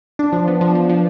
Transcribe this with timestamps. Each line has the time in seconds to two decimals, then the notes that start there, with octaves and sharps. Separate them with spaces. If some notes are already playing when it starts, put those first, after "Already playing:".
0.19 D4
0.33 F3
0.48 B3
0.61 F3
0.75 F3
0.89 F3